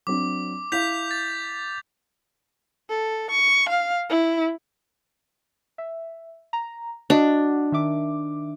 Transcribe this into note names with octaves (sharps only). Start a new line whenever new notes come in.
F#3 C4 D4 D6
E4 F5 G6 B6 F7
A6
A4
C#6
F5
E4
E5
A#5
D4 F#4 D#5 F#5
D#3 E5 D6